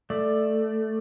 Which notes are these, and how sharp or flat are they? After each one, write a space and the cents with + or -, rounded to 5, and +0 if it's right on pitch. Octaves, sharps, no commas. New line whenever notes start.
A3 +0 D5 +15